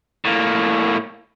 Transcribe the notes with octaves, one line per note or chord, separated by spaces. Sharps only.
A2 A#3